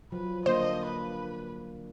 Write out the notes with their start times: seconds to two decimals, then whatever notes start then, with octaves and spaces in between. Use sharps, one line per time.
0.12 F3 F#3 B4
0.46 D3 A#3 D4 C5 D#5
0.85 B4